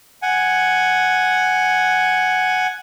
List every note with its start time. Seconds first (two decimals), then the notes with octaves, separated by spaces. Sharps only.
0.22 F#5 G#5